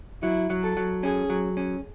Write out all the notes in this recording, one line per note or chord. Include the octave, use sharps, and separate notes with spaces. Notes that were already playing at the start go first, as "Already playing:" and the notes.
F#3 E4
F#3
A4
F#3
C#4 G#4
F#3
C#4